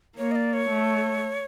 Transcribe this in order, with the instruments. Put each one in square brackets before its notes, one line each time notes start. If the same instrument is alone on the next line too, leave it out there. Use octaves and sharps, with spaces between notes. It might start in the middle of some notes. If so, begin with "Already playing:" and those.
[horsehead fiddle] A#3 [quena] C#5
[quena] D#5
D5
C#5
[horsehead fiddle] A3